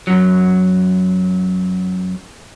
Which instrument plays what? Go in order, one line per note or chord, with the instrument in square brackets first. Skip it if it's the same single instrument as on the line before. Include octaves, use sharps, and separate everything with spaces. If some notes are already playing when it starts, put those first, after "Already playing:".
[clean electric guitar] F#2 F#3